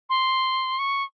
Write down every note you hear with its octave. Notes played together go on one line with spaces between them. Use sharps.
C6
C#6